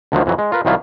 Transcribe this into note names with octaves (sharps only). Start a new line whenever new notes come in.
D2 D3 D#3 F3 F#3
F2 E3 F#3
G#3
F4 A#4 B4
C2 D#3 F3 F#3 E4 F4